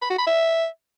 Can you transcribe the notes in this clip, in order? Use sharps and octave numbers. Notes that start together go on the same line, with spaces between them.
B5
F#4
B5
E5